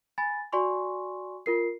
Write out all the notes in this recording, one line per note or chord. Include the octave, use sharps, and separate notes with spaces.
G#5 B5 A6
F#4 D5 G#5 C6 C#6
F4 A#4 C7